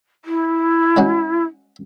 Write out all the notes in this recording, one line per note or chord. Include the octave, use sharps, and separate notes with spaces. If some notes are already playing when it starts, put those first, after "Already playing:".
E4
G#3 C#4 F#4